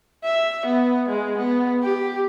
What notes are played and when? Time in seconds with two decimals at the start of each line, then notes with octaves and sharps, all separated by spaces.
0.24 E5
0.66 B3
1.09 G#3
1.38 B3
1.83 G4